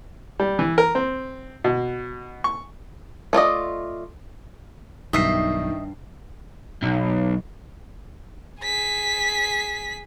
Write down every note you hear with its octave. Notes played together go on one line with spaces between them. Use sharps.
G3
E3
A#4
C4
B2
C#6
A3 F4 D5 D#5
B1 G2 D#3 D#5 E5 C7
B1
G#4 B6